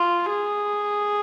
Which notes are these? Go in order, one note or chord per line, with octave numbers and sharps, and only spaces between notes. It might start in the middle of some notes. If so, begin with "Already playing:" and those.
Already playing: F4
G#4